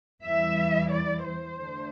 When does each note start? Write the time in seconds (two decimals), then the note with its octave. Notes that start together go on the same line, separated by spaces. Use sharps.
0.21 E2 E3 G3 E4 E5
0.89 D5
1.23 C5
1.57 D3 A3 D4